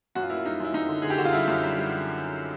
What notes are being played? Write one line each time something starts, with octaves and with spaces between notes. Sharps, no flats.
F#2 F#4
F4
A#3 E4
F4
G3 D#4
F#2 E4
F#2 D#4
D3
D3 G#4
G4
D3 F#4
F4
G3 E4
F#2
G3
G3